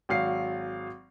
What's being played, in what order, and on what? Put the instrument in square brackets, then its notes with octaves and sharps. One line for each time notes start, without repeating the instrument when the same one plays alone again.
[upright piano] G#1 F#3 F5 C7